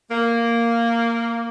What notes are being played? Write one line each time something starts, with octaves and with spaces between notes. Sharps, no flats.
A#3